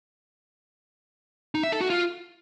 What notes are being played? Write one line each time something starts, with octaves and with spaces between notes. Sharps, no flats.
D#4
E5
A4
F#4
F4